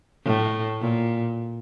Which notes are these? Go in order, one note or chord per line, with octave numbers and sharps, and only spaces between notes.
A2
A#2